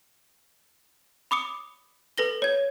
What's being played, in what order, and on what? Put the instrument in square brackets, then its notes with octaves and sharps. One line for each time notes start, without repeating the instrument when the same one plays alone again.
[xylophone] B5 D6 D#6 C#7
A4 B4 A#6 G7
C#5 G#6